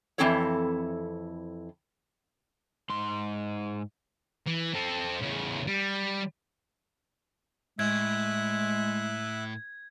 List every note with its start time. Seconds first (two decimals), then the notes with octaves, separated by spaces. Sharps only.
0.18 F2 E3 C4 E4 A4 C#5
2.90 G#2 C6
4.46 E3
4.74 C4 A4
5.22 E2 C#3
5.67 G3
7.79 A2 G#3 E5 F#6 G#6